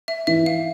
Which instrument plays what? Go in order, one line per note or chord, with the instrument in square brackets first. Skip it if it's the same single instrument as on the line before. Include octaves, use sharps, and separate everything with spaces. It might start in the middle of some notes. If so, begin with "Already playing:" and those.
[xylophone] E5
[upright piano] E3 [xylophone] E5
[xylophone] F5